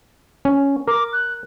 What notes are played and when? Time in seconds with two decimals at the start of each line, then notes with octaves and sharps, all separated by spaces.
0.45 C#4
0.88 A#4 D6
1.13 F#6